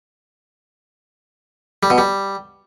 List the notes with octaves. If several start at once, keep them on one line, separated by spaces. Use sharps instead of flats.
G3
B2
G3